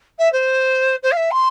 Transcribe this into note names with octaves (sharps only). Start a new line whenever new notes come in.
E5
C5
C5
F5
E5
C6